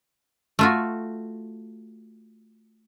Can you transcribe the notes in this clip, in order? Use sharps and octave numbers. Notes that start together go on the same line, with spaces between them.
A3 F4 F#4